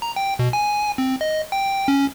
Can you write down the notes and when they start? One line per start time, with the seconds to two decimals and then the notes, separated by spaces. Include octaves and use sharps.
0.02 A#5
0.16 G5
0.39 B2
0.53 G#5
0.98 C4
1.21 D#5
1.52 G5
1.88 C#4